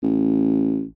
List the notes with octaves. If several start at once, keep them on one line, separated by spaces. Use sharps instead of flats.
A1